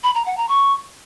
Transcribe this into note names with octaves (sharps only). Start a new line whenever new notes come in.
B5
A#5
F#5
A#5
C#6